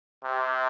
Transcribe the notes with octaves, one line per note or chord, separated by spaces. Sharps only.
C3